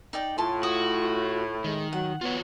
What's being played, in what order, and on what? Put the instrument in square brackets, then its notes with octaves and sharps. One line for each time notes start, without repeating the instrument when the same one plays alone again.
[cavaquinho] D#4 D5 G5
[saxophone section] A2 [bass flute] F4 [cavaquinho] A5 C6
[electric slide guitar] F#4 [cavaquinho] D#6
[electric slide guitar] D#3 [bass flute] G#3
[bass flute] F#3 [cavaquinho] F#5
[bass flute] B3 [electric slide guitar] F4 F#4 C#5